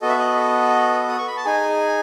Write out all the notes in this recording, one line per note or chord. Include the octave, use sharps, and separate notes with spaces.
B3 F#4 A4 D#5
E5
D#5
D#6
C#6
B5
A5
D#4 G#4 G#5